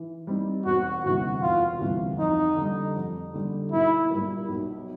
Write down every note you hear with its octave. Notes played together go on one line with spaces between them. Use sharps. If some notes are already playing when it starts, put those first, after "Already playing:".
Already playing: E3
G3 C4 D#4
E1 F#4
D2 C3 E3 G3 F#4
E1 F4
D2 C3 E3 G3
F2 D#4
D3 G3
F2
D3 G3
B1 E4
A#2 G3 A#3
B1